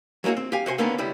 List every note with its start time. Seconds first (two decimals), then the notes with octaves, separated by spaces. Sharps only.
0.24 F#3 G#3 A#3 E4 F#4
0.37 C4
0.52 G4 F5 G#5
0.66 C3 F#4 C5 G#5
0.78 D3 D#3 A#3 B3 C#4 D4
0.98 C#2 G3 E4